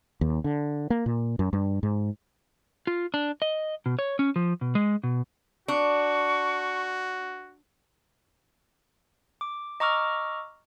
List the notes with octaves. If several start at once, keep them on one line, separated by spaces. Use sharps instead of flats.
D#2
D3
A#3
A#2
F#2
G2
G#2
F4
D4
D#5
B2
C#5
C#4
F3
B2
G#3
B2
D4 F#4 C#6
D6
D#5 A#5 C#6 D6 E6 F6